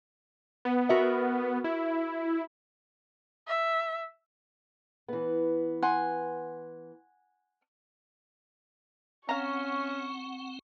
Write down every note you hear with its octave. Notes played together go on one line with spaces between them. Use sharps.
B3
F#4 A#4 E5
E4
E5
E3 B3
F#5 G#5 C6
C4 C#4 F5 F#5 A#5 C#6